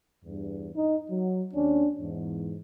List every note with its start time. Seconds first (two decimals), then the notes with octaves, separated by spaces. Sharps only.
0.25 E2 G2
0.75 D#4
1.10 F#3
1.53 D#2 C#4 D4
1.99 E2 G#2